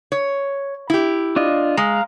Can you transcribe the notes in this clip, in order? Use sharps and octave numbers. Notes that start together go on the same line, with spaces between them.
C#5
E4 G4
D4 F4 D#5
G#3 F5 A#5